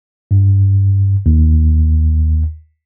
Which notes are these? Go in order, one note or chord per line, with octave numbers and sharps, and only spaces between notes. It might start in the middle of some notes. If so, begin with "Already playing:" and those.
G2
D#2